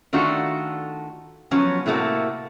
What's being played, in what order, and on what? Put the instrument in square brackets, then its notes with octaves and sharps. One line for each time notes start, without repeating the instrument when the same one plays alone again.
[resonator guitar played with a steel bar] D#3 A3 D4 F4 F#4 A4
F3 F#3 B3 C#4 C#5
A2 C3 A3 A#3 F#4